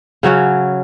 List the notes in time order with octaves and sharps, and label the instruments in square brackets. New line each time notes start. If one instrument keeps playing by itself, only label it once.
[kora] C#3 F#3 C#4 F#4